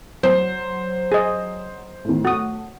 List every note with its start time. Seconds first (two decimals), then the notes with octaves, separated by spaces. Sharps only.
0.23 F#3 C5
1.12 G#4 D#5
2.04 A2 D#3
2.25 A3 F#4 D#6